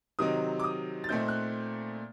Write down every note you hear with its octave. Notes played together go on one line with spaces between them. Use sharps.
C3 D#3 F#3 C4 D#4 D#6
D6
D#6
A6
A#2 A3 C4 D#4 G6
F#6